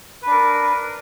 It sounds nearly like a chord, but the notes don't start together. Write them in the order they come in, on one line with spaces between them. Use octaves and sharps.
B4 D4 A#4